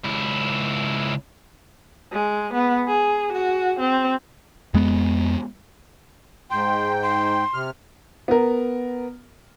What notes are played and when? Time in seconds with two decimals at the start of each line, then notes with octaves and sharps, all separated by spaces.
0.04 C#2 E4
2.12 G#3
2.54 B3
2.87 G#4
3.32 F#4
3.80 C4
4.74 F2 G#3 B3
6.51 G#2 G5 C6
7.03 C6
7.54 C3 F6
8.28 B3 A#4